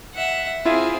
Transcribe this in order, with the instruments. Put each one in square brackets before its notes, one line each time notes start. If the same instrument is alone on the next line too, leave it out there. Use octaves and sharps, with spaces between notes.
[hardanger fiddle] E5 F#5
[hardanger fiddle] C4 G#4 [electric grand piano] E4 F4 E5